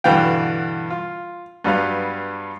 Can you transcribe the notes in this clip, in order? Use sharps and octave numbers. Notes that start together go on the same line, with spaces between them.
G2 B2 D3 E3 F5 G5
F4
G2 F#3 G3 B3 F5